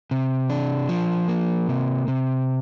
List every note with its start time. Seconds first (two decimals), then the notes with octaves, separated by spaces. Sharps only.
0.11 C3
0.50 D4
0.89 F3
1.28 A#3
1.68 C3
2.08 C3